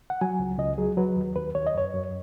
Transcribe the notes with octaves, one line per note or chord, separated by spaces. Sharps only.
F#5
F#3 G#5
C#2
C#2 D#5
F#3 G#4
F#3 B4
D#2
D#2 B4
D#2 C#5
D#5
F#2 C#5
F#2